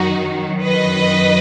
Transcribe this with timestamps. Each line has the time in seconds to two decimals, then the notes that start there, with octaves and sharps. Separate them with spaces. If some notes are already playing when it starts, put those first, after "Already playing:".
Already playing: F#2 D#3 F#3 D#4 F#4
0.62 B4 D#5